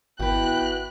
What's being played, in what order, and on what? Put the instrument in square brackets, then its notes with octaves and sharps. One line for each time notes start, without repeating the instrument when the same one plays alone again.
[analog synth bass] G#1 [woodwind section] B3 E4 G5 [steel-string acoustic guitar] F#4 B4 [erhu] F#6